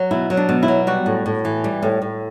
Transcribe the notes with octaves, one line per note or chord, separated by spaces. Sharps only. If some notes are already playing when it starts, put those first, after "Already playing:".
Already playing: F#3
B2 E4
F#3
D4
B2
E4
F#3
G3 F#4
A2
A2
E3
G3
A2
A2